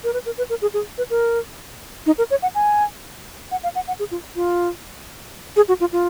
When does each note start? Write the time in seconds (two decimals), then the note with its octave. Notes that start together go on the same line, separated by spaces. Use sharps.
0.04 A#4
0.13 B4
0.26 A#4
0.38 B4
0.50 A#4
0.62 G#4
0.74 G#4
0.98 B4
1.10 A#4
2.06 D#4
2.18 A#4
2.30 C#5
2.42 F#5
2.55 G#5
3.51 F#5
3.63 F5
3.75 F#5
3.88 F#5
3.99 G#4
4.11 F4
4.36 F4
5.56 G#4
5.68 F#4
5.80 F4
5.92 F4